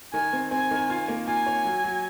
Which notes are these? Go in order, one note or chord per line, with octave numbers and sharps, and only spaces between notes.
D#3 G#5
C4
C4 G#5
D#3
F4
A#3
F4 G#5
C#5
F#3
F#3